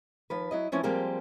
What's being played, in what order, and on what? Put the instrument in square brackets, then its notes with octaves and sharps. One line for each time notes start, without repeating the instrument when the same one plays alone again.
[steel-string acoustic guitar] D#2 F3 B4
F#3 E4 D#5
E3 F3 C#4 E4
F3 G3 G#3 A#3 C4 G4